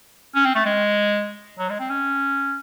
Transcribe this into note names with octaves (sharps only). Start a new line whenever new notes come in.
C#4
C4
A3
G#3
F#3
G#3
C4
C#4